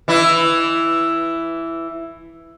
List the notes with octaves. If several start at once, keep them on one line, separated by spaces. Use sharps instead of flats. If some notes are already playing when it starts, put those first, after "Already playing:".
E3 E4